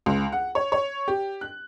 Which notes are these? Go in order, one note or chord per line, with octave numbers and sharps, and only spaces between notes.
C#2
F#5
C#5
C#5
G4
F#6